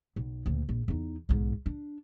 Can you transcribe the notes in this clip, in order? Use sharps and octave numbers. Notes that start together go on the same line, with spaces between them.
B1
D2 A#2
A#1
E2 D#4
B1 G#2
D4